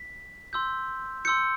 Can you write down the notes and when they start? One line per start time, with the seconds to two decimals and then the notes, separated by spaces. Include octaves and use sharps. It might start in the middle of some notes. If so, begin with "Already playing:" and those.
Already playing: B6
0.53 C6 E6 G6
1.25 C6 E6 G6 C#7